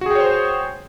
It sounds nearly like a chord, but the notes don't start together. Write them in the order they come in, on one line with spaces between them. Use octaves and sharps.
F#4 G#4 G5 C#5 C5